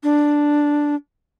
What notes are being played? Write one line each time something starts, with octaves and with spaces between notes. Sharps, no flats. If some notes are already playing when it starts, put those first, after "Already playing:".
D4